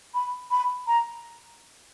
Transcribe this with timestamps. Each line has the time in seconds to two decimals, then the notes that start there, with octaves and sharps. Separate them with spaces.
0.14 B5
0.51 B5
0.87 A#5